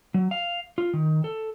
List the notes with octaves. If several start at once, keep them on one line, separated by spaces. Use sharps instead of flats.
F#3
F5
F4
D#3
A4